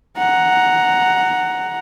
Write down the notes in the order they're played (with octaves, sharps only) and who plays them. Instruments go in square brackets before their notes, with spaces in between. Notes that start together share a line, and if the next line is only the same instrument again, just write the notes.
[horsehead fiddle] F#5 A#5